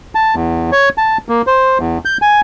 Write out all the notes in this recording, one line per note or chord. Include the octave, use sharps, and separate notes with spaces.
A5
E2
C#5
A5
A#3
C5
E2
G6
G#5